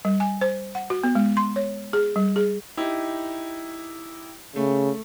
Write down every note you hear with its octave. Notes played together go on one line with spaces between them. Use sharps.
G3
G#5
C5
F#5
F#4
B3
G#3
C6
C#5
G#4
G3
G#4
D#4 E4 G4
C#3 A3